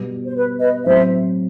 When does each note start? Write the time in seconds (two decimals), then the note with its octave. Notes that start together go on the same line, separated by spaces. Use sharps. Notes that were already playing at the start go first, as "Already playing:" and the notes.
Already playing: B2 G3 B3
0.26 C5
0.35 B4
0.60 B4 D#5
0.85 A2 F#3 C4 C5 E5